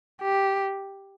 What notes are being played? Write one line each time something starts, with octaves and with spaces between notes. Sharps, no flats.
G4